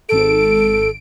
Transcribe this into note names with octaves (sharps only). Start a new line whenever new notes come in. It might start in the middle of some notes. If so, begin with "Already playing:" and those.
G#1 A4 D7